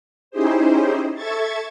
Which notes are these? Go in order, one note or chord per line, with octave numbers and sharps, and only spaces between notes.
C#4 D#4 E4 G4 G#4 C5
A4 E5 C#6 G#6 A6